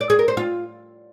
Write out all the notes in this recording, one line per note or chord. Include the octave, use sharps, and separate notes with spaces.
D5
G#4
A#4
C5
F4